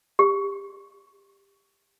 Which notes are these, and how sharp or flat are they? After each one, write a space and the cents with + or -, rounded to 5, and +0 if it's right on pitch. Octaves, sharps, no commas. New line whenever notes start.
G4 +20